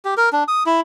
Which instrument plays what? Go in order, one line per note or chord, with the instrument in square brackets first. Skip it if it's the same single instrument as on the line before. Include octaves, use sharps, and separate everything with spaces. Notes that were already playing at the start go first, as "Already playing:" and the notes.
[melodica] G4
A#4
D4
D#6
E4